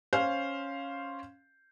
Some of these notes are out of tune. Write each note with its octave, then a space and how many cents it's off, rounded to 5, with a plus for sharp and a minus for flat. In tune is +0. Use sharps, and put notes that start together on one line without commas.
C#4 -5 C5 +0 F5 +0